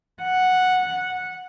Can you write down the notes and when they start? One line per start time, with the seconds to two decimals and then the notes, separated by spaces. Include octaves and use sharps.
0.23 F#5